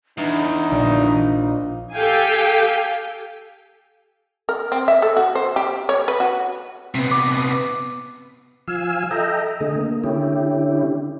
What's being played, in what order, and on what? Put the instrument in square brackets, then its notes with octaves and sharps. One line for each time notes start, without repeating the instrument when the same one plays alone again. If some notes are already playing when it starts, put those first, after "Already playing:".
[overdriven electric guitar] E2 [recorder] D4 [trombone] D#4
[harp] A#1
[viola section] G4 A4 F5 G5 G#5
[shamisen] A#4
C4
E5
A4
F#4
C5
G4
C#5
B4
F#4
[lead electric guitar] C3 B3
[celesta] D6
[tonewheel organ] F3 F5 G#5 E6
A4 D#5 E5 G5 A#5
D3 A3 G#4 D#5
A#3
D3 C#4 E4 G4